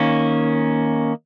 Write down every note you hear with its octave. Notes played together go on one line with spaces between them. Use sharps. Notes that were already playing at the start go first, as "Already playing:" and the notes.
Already playing: D#3 A#3 C#4